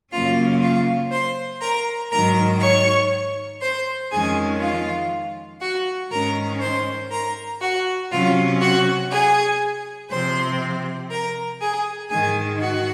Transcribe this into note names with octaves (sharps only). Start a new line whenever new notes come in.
F#2 C#3 F#3 A#3 C#4 F4 F5
F4 F5
C5 C6
A#4 A#5
G#2 D#3 F#3 A#4 A#5
C#5 C#6
C5 C6
F2 D#3 G#3 C#4 G#4 G#5
F4 F5
F#4 F#5
G#2 D#3 G#3 C#4 A#4 A#5
C5 C6
A#4 A#5
F#4 F#5
C3 F#3 C#4 F4 F5
F#4 F#5
G#4 G#5
C3 F3 C4 C5 C6
A#4 A#5
G#4 G#5
G#2 D#3 G#3 G#4 G#5
F#4 F#5